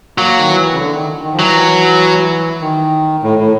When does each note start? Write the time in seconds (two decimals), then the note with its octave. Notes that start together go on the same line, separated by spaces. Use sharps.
0.17 F#3 A#3
0.37 D#3
0.48 E3
0.73 C#3
0.78 D3
0.94 D#3
1.24 D#3
1.33 F3
1.39 E3 F#3
2.61 D#3
3.23 A2
3.39 A2